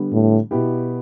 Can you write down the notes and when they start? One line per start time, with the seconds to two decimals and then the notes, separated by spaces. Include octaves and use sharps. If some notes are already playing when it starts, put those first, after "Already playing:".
Already playing: D3 G3 B3
0.13 A2
0.51 B2 B3 E4 G4